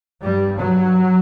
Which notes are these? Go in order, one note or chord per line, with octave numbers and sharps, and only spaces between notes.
G2 G3
F#3